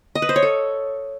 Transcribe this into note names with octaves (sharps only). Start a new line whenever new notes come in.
D#5
B4
C5
C#5
A4